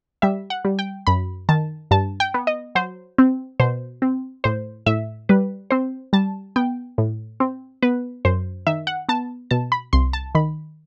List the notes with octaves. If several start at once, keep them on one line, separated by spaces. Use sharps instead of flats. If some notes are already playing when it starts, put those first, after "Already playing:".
G3 E5
F#5
G3
G5
F#2 B5
D#3 A5
G2 A5
G5
B3
D#5
F#3 C5
C4
B2 C5
C4
A2 C5
A2 E5
G3 B4
C4 C5
G3 A5
B3 G5
A2
C4
B3 B4
F#2 C5
D#3 E5
F#5
B3 A5
B2 A5
B5
C2 C6
A5
D#3 B5